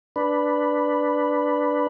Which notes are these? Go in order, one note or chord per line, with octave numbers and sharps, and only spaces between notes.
D4 B4